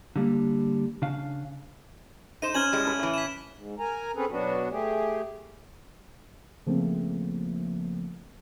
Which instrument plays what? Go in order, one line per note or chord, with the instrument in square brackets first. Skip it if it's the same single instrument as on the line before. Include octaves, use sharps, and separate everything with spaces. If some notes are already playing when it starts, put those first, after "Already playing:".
[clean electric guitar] D3 G3 A#3
C#3 D4 F5
[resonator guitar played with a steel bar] D#4 C5 [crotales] D#7 E7
[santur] C#4 D#6 [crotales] F6 G#6 F#7
[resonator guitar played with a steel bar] A2 G3 G#3
[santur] B5
[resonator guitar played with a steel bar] A2 E3
[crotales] B6 E7
[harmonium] G#2
A#4 G#5 A#5
C4 C#4 G#4 A4 B4
B2 F#3 B3 D4 F#4
A3 G4 G#4
[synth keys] C#3 F3 A3 A#3 C4